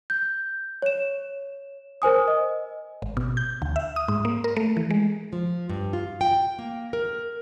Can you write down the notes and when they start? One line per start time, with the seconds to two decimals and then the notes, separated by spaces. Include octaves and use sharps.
0.10 G6
0.82 C#5 E7
2.02 A#4 C5 G#5 D#6
2.28 D#5
3.02 G#1
3.17 B2
3.37 G6
3.62 D2
3.76 E5
3.96 D#6
4.08 G#2
4.25 A#3
4.44 A#4
4.57 A3
4.77 E3
4.91 G#3
5.33 F3
5.69 G2
5.93 F4
6.21 G5
6.59 A#3
6.93 A#4